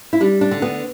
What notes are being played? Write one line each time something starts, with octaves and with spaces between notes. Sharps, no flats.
E4
G3 D4
D4
D3
B3